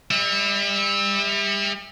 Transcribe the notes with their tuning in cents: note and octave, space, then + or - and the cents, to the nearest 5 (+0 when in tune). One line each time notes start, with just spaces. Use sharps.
G3 +35 E5 -15